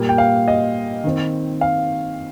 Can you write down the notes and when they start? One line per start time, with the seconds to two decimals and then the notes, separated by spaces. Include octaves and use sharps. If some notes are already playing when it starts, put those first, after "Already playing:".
Already playing: A#2 G3 A#3
0.09 G5
0.18 F5
0.48 D#5
1.04 D#3 C4
1.61 F5